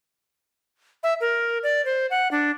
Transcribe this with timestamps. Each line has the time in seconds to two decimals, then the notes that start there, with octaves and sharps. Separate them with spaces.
1.03 E5
1.21 A#4
1.63 D5
1.85 C5
2.11 F#5
2.31 D4